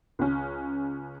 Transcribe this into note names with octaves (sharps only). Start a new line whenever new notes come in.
C#2 C#4